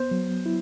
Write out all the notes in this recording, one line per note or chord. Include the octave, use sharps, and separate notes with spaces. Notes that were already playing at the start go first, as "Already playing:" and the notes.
Already playing: B3 C5
F#3
E4